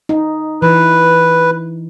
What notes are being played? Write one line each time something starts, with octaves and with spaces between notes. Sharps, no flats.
D#4
E3 B4